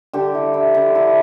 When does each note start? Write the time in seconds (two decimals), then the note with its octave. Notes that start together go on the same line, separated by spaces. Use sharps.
0.13 D3 G4
0.35 E4
0.54 E4
0.75 D3
0.95 E4